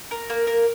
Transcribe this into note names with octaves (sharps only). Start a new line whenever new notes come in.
A#4
A#3
A#4